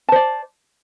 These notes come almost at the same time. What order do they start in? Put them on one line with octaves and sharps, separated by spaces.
A5 C5 D5